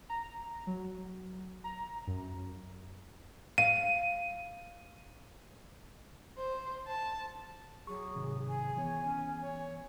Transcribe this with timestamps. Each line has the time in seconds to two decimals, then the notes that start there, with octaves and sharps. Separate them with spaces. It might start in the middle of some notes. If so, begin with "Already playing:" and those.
0.10 A#5
0.67 F#3
1.64 A#5
2.07 F#2
3.58 F5 D#7
6.38 C5
6.88 A5
7.87 F#3 G#4 C#6
8.16 G#2 C3 D#3
8.48 G#4 G#5
8.76 E3 B3 C#5
9.04 C#4
9.41 C#5